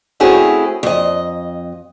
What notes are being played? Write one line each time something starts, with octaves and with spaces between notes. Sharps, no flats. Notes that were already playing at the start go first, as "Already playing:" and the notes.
A3 C4 C#4 E4 F#4 G#4
F2 D#5